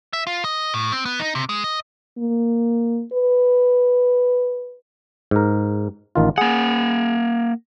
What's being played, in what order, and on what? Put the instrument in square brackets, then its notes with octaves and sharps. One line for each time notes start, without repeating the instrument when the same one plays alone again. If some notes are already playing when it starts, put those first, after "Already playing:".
[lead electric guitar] E5
F4
D#5
A2
C4
B3
D#4
C3
G#3
D#5
[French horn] A#3
B4
[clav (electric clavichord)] G#2 A#4
A1 D#3 F4
[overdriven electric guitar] A#3 F#5 [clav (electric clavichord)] G#4